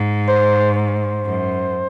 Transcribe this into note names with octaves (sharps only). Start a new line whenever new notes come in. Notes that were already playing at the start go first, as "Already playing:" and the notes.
Already playing: G#2
C5
C5
F#2